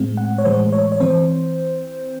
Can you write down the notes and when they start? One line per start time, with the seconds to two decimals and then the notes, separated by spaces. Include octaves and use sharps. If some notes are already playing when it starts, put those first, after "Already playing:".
Already playing: A2 G#3 C4
0.17 F#5
0.38 C#5
0.45 A2 E3 G#3 C5
0.73 C#5
0.92 C#5
1.00 E3 C4 C5